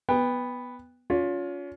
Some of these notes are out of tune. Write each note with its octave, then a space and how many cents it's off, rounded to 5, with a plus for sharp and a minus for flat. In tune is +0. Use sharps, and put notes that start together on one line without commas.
B3 +0 G5 +25
C#4 +35 F4 +25